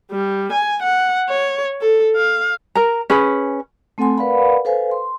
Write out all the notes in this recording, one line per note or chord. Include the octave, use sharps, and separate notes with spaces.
G3
G#5
F#5
C#5
A4
F5
A#4 A#5
C#4 G#4 B4 B5
A3 C4 A4 F#5 G#5 C6
A#4 B4 D5 F5 F#5 B5
A4 B4 C5 F5 G#5
C6